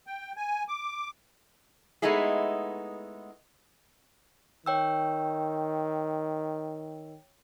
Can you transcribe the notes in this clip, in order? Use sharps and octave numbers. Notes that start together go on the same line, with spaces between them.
G5
G#5
D6
G#3 A3 B3 D#4 E4 G#4
D#3 C#5 G5 E6